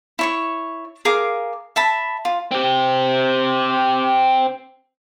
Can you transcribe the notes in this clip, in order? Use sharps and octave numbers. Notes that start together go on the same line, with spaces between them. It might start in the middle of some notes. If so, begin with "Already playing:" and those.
E4 C#5 C#6
G#4 A#4 F5 D6
E5 A5 B5
F4
C4 G4